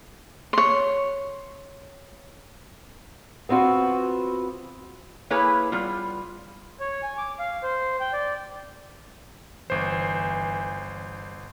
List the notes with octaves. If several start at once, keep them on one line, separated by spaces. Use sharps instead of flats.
C#5 C6
B3 C4 F4 F#4 B4
A#3 E4 G#4 B4 C#5
G3 B3 F4
C#5
G#5
D6
F5
C5
G5
D5
G1 E3 C5